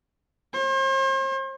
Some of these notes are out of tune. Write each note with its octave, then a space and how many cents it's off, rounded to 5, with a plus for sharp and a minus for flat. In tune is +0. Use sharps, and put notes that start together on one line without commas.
C5 +40